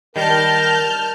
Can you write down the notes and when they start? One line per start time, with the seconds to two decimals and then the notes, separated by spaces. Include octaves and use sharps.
0.16 D#3 G3 A#4 A5 F6 G6